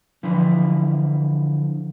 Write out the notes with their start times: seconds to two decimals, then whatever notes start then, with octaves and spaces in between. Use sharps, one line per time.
0.23 D3 E3 F3 E4